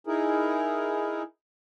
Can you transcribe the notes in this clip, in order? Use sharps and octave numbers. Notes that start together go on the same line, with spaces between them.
D#4 E4 G#4 A#4